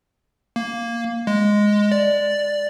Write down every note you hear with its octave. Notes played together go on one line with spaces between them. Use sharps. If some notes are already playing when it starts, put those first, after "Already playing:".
A#3
G#3
D5